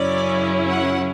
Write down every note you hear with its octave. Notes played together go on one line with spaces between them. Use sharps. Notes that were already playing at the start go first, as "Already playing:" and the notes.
Already playing: F#2 C#3 F#3 C#4 E4 D5
F#5